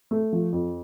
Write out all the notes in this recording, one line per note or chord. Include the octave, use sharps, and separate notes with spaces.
A3
F3
F2